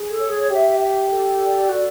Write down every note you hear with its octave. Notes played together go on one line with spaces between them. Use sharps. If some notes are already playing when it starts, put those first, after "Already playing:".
Already playing: G#4
A4
C#5
G#4
G4 E5
E5
A4
D5
F#4 A4